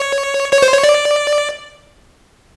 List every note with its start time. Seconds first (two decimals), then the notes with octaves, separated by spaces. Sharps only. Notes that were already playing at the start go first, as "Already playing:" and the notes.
Already playing: C#5
0.53 C#5
0.62 C5
0.73 C#5
0.83 D5